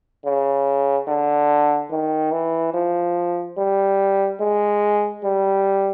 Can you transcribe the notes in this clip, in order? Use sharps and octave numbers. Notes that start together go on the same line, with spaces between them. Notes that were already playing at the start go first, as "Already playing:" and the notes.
C#3
D3
D#3
E3
F3
G3
G#3
G3